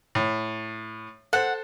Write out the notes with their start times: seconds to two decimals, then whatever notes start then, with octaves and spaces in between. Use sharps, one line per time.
0.15 A2
1.33 A4 C5 F#5